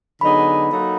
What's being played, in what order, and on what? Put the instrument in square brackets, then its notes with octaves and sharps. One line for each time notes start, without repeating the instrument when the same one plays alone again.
[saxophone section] D3 F#3 B3 D#4 G#4 [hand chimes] B5
[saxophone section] F#3 A#3 D#4 F#4 A4